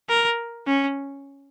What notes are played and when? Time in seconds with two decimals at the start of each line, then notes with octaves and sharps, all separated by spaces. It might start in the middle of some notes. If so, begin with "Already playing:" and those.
0.09 A#4
0.68 C#4